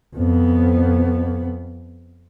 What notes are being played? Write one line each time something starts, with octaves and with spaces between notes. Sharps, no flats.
F2 B3